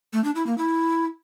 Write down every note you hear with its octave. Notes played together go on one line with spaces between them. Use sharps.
A3
D4
E4
A#3
E4